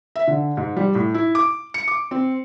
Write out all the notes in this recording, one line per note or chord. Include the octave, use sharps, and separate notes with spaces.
E5
D3
G#2
G3
A2
E4
D6
C#7
D6
C4